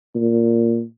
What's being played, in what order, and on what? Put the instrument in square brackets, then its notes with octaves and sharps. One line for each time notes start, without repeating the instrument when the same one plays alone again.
[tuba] A#2